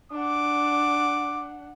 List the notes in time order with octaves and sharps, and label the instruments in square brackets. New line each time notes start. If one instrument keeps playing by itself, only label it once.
[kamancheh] D4 F#5 [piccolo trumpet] D6